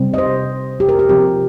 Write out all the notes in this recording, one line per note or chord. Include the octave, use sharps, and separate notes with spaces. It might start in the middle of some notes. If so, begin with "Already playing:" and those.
Already playing: C3 G3 C4
D#5
C5
G4
A#4
G4
C3 F3 C4 G4